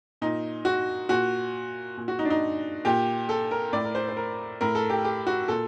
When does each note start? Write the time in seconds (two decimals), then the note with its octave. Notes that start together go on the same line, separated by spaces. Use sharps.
0.22 A#2 D#4
0.65 F#4
1.09 A#2 F#4
1.97 A#2
2.08 F#4
2.19 D#4
2.25 D4
2.30 D#4
2.85 A#2 G4
3.29 A4
3.51 A#4
3.73 A2 D5
3.85 A#4
3.95 C5
4.09 C5
4.17 A#4
4.61 A2 A#4
4.75 A4
4.90 G4
5.05 G4
5.27 F#4
5.48 A#2 A4